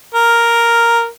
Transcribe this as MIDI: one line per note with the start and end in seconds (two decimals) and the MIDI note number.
0.14 1.07 70